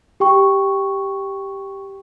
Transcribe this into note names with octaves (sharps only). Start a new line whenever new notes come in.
G4 G5 C#6